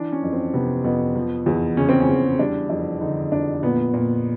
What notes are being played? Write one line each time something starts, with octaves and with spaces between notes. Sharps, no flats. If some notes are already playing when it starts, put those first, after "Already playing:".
Already playing: E3 D4
C#4
F2
C4
C3 B3
F2 B3
F3
E2
C#3 C#4
C4
C#4
E2
G3 D4
F2 D4
D3 D#4
F2 D4
A#2 B3
A#2